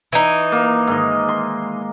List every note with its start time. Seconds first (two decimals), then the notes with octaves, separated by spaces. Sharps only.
0.12 E3 D#4
0.52 A#3
0.87 G#2 D#3 D#5
1.28 C6